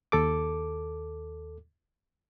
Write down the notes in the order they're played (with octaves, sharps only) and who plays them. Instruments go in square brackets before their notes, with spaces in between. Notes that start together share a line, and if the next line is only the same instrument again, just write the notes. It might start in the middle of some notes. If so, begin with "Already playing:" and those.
[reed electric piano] D#2 A4 D6